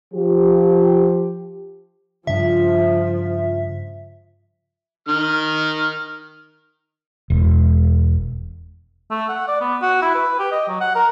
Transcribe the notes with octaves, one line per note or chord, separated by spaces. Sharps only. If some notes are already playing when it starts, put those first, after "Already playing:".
F3 G4
G2 C#3 F3 E5
D#3 F6
E1
A3
F#5
D5
B3
F#4
E4
B4
G4
D#5
F#3
F#5
A#4